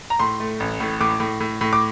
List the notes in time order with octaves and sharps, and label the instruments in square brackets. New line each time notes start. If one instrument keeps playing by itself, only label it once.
[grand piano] A#5
A2 C6
A3
A1
A2
A2 D6
A2
A2
A2
D6